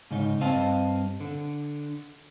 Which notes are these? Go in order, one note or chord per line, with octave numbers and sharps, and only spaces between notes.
G#2 C#3 D#4
G2 C4 D#5 F5 A5
D3